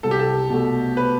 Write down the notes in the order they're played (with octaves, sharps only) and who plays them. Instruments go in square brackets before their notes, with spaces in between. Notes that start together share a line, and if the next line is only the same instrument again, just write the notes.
[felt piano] C2 [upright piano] A4
[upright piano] G4
A4
[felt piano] B2 A3
[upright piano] B4